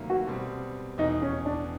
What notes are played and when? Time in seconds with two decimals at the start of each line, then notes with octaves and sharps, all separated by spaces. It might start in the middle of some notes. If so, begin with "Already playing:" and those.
Already playing: D2 C3 D#3 F#3 A#3
0.10 F#4
0.27 B2 G3 C4
0.98 F1 E2 B2 D#4
1.22 C#4
1.45 D4